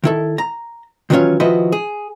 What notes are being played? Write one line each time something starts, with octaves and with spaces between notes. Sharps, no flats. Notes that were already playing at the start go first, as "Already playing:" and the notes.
D#3 E4 A4
A#5
D#3 E3 F#3 C#4 F4 C#5
D#3 F3 E4 F#4 B4 D#5
G#4